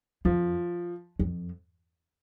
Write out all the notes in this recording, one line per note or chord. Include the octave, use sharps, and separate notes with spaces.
F2 F3
F2